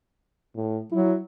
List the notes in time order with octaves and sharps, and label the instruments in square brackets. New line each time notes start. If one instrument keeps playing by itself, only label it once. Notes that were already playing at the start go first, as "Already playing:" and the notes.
[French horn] A2
[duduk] F#3 [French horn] E4